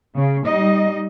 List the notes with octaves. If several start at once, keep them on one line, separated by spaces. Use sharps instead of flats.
C#3
G3 D#4 D#5